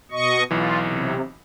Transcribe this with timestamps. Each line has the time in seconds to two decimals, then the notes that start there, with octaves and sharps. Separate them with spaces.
0.11 B2 D#5 C#6
0.51 B1 E3 F4
0.86 C3